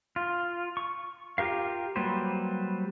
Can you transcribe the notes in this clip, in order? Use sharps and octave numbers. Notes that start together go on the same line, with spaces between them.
F4
C#6
F4 G4 A#4 F5
F#3 G3 A#3 B4 C5